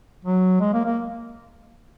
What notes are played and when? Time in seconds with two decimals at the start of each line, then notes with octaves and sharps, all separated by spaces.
0.25 F#3
0.61 G#3
0.73 A#3
0.85 A#3